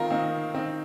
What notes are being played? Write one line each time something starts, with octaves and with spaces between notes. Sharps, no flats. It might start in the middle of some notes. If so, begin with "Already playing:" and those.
Already playing: D#3 C4 D#4 F4 A#4
D#3 C4 D#4
D#3 C4 D#4